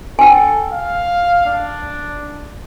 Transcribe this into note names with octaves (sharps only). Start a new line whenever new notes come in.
A4 G5 G#5
F5
D4